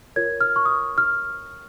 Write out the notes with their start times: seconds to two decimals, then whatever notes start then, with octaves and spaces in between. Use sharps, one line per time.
0.16 F4 A#4 C#5 G#6
0.41 F6
0.56 C#6
0.65 D#6
0.98 F6